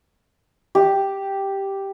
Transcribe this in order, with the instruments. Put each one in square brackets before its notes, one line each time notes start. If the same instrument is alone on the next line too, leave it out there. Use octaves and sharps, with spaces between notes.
[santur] G4